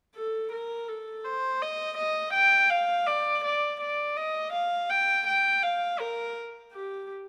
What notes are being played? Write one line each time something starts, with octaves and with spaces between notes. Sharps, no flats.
A4
A#4
A4
C5
D#5
D#5
G5
F5
D5
D5
D5
D#5
F5
G5
G5
F5
A#4
G4